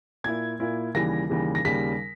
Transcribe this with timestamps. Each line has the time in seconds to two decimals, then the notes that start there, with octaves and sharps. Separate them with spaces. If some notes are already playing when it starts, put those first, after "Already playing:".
0.24 A#2 A#3 E4 G#6
0.60 A#2 A#3 E4
0.94 D#2 C#3 E3 G3 A#6
1.30 D#2 C#3 E3 G3
1.55 A#6
1.65 D#2 C#3 G3 B6